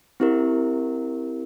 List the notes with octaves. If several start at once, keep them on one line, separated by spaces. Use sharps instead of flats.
C4 E4 G4 A#4